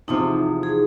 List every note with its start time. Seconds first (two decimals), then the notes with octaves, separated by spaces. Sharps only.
0.08 E2 C3 F3 D#4
0.63 G#4